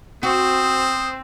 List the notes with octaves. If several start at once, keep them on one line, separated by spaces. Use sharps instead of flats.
C4 F#4 C5 D#6